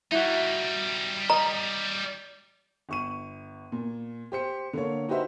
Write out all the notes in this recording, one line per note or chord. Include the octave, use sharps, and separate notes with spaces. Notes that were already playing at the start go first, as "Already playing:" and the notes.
G3 D#4 E4 F#4
D#5 A#5
G1 C#6 D#7
A#2
G4 C5 C#7
D3 A#3 C#5
D#4 F#4 G4 B4 C5 E5